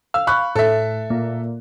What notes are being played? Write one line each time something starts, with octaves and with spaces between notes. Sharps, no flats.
F5 E6
B5 C#6 F#6
A2 A4 E5
A#2